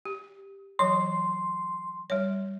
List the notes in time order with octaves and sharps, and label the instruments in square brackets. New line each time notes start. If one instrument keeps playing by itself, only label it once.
[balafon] G4
[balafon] E3 F#3 C#5 [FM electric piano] C6
[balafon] G3 C#5